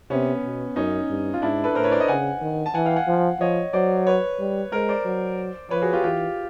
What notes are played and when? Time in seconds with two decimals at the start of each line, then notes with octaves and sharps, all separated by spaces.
0.10 C3 B3 C#4
0.44 B2
0.76 F#2 C#4 D#4
1.10 G2
1.34 F4
1.42 G#2 D4 E4
1.64 A4 B4
1.75 A2 A#4 C5
1.84 B4 C#5
1.91 C5 D5
2.00 C#5 D#5
2.08 C#3 F#5 G#5
2.41 D#3
2.66 A5
2.74 E3 F#5 G#5
2.85 F5 G5
2.96 F#5 G#5
3.08 F3
3.40 F3 C#5 D#5
3.73 F#3 C5 D5
4.07 B4 C#5
4.39 G3
4.72 G#3 A#4 C5
4.89 C5 D5
5.05 F#3
5.70 F3 B4 C#5
5.82 F#4 G#4
5.93 F4 G4
6.04 E3 F4 G4